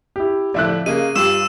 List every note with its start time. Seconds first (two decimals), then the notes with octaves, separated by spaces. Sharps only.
0.16 E4 G4
0.54 F2 A2 D3 D5 E5 F#6
0.86 C#3 A#3 D#5 D#7
1.15 G2 F4 G4 E6 E7